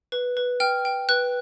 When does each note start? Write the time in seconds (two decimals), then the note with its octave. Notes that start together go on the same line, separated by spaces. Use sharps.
0.12 B4
0.37 B4
0.60 G5 F6
0.85 G5
1.09 B4 F#6